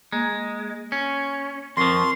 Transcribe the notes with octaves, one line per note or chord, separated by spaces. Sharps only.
G#3 A#3
C#4
F2 F3 C4 A#4 C6 C#6